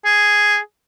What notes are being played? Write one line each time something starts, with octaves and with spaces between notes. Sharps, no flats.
G#4